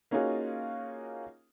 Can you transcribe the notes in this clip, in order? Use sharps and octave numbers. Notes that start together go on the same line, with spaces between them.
A#3 C#4 D#4 F4 F#4 G#4